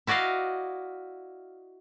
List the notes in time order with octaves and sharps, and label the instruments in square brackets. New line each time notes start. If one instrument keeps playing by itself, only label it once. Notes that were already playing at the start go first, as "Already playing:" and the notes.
[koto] E4 F#4 D5 D#5 F5